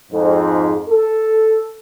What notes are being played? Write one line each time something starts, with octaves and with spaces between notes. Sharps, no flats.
F2 G#2
A4